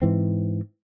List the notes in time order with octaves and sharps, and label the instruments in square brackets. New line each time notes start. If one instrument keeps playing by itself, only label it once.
[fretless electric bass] G#2 E3 C4